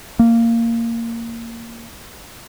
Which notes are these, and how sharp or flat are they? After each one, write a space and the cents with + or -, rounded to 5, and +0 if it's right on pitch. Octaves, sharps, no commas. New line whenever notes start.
A#3 -15